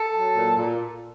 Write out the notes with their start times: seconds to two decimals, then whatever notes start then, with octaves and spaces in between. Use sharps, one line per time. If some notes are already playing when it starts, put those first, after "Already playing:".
Already playing: A4
0.14 F#3
0.36 A#2
0.57 A#2